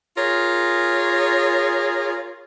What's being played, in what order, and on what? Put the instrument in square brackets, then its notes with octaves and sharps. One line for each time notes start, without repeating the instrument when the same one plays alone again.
[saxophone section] F4 G#4 A#4 C#5